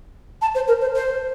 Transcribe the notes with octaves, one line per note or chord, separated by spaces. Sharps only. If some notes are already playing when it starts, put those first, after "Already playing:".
A5
C5
A#4
C5
C5